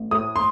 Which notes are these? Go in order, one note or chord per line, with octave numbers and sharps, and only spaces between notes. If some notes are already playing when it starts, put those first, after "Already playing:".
Already playing: A1
A2 D#6
C6